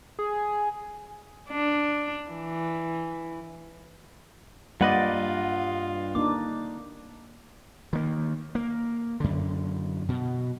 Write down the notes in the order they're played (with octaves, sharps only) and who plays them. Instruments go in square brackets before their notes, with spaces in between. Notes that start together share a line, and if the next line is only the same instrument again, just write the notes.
[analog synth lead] G#4
[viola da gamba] D4
E3
[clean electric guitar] G2 B4 D#5 [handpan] G3 A#3 D5 [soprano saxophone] F4 [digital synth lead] F#5
[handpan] A#3 D4 D#4 [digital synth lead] D6
[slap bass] D#3 A#3
A#3
F#2 D3
B2